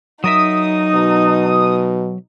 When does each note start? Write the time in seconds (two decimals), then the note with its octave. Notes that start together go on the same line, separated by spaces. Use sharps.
0.24 F#3 D#4 A#4 E5 D#6
0.94 B2